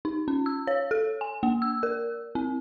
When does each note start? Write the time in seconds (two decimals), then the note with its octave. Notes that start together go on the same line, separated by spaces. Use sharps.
0.05 D#4
0.28 C#4
0.46 E6
0.67 C#5
0.91 A4
1.21 G#5
1.43 A#3
1.62 E6
1.83 A#4
2.35 C4